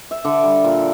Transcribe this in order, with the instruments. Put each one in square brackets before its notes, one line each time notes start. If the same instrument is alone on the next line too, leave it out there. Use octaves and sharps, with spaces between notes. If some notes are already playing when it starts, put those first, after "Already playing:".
[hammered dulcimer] E5
D3 D5
G3
A#2